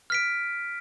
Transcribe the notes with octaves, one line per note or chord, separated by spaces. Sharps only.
F6 B6 D7